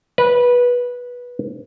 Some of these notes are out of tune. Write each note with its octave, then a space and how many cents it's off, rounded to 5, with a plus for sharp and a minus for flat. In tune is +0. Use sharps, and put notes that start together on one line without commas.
B4 -15